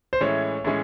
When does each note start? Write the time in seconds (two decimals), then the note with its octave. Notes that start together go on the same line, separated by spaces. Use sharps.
0.13 C5
0.21 A2 E3 G#3 C#4 C#5
0.65 A2 E3 G#3 C#4